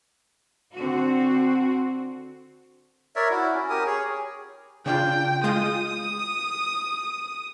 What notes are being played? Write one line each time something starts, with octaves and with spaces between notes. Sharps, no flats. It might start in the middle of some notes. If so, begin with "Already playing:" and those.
D3 C4 F#4
A#4 C#5 D5 E5
E4 F#4
C#4
G4 A#4 D#6
G#4 C#5
C#3 D4 F4 G5
G#3 F4 D#6 G6